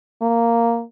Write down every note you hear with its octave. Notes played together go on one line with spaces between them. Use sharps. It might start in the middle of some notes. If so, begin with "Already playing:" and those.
A#3